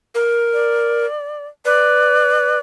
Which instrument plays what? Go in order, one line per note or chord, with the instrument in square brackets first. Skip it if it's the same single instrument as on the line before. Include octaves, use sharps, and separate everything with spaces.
[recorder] A#4
[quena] D5
[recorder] B4 [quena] D5